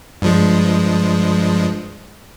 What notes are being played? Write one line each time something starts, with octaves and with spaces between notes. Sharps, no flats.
G2 F3 G#3